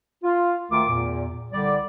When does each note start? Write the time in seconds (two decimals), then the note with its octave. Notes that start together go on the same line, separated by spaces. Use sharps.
0.23 F4
0.71 D2 D#3 A3 F4 A#4 D6
0.88 E2 A#2
1.52 C2 D3 G3 D5